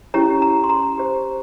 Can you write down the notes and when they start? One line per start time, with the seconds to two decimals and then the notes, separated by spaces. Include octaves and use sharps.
0.14 C#4 E4 G4 C#5 A#5
0.42 A#5
0.64 C6
0.70 A#5
0.98 G4 C5